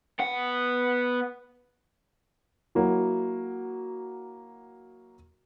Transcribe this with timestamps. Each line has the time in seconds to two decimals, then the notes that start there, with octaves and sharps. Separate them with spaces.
0.19 B3 F#5
2.75 F#3 A#3 E4 F#4